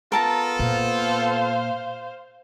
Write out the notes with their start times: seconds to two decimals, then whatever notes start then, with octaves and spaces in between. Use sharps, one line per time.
0.12 B3 F4 A4 A#4 A5 A#5
0.59 A#2 C5 F5